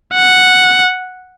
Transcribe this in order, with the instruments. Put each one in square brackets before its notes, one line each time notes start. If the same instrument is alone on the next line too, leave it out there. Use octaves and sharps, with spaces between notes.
[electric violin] F#5